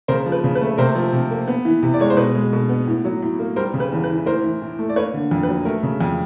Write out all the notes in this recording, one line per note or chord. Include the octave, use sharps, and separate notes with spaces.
C#3 A#4 C5
F3
B4
C#3
B4
A3
C3 A#4 C5
F3
C3
A#3
B3
E3
C3
D5
G#3 C#5
C5
B2 B4
G#3
B2
B3
A2
F#3
A2
A#3
G3 A#4 C5
C#3
B4
E2
B4
E3
A2 A#4 C5
E3
A2
A3
D5
A#3 B4 C#5
D3
F2
B4
F#3
A3 A#4
C#3
F2